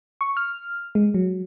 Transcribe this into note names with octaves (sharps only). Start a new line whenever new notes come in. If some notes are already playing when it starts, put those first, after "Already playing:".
C#6
F6
G#3
F#3